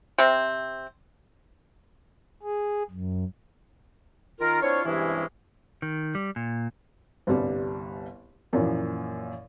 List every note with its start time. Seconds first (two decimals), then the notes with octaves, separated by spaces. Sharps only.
0.18 C3 C4
2.42 G#4
2.90 F#2
4.40 D#3 F4 A#4
4.63 C4 D4 E4 F4 C#5
4.85 G2 C3 E3 G#3 C#4 E4
5.82 D#3
6.15 G3
6.36 A#2
7.27 G1 C2 G3
8.53 F#2 A#2 E3 F3 A#3